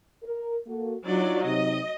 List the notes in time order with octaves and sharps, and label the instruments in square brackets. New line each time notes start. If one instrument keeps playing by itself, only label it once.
[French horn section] A#4
A#3 F#4 A4
[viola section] F#3 D5 [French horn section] D4 D#4 F4
[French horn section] C3 D#4 [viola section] D#5